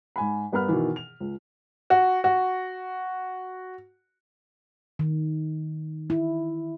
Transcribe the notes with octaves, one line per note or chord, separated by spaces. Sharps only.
G#2 G#5 B5
G2 B3 A#4 F#5 B5 F6
B2 D#3 E3
F7
C#2
F#4
F#4
D#3
E4